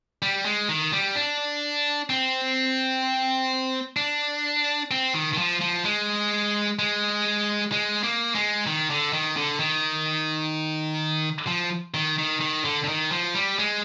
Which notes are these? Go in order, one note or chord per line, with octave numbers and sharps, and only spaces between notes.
G3
G#3
D#3
G3
D4
C4
D4
C4
D#3
D#3
F3
F3
G#3
G#3
G#3
A#3
G#3
D#3
D3
D#3
D3
D#3
F3
D#3
D#3
D#3
D3
D3
D#3
F3
G3
G#3